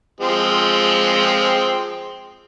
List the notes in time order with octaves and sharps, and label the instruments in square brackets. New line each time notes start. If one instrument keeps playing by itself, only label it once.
[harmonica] F3 G#3 C4